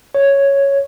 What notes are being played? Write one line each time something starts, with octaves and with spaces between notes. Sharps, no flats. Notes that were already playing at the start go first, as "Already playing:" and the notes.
C#5